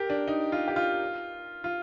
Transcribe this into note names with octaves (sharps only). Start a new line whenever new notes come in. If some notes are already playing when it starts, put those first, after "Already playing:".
Already playing: G4 A#4
D4
D#4
F4
G4
F4
F4